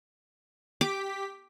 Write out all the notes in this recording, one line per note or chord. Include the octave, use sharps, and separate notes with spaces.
G4 D6 B6